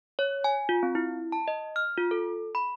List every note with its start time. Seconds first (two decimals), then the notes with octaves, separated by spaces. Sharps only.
0.19 C#5
0.44 G#5
0.69 F4
0.83 C4
0.95 E4
1.32 A5
1.48 D#5
1.76 F6
1.97 F4
2.11 A4
2.55 B5